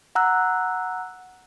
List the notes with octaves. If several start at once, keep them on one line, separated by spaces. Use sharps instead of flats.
F#5 A#5 E6 F#6